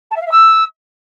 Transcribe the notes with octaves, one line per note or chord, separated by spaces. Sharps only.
A5
E5
F5
E5
E6